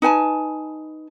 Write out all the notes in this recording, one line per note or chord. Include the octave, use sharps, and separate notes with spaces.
D#4 B4 G#5 A5